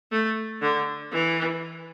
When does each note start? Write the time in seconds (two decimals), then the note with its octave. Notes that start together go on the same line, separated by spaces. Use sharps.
0.12 A3
0.62 D3
1.12 E3